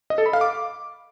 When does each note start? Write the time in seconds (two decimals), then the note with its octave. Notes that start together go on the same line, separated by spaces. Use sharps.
0.10 D#5
0.18 A4
0.26 B5
0.33 F5
0.41 D6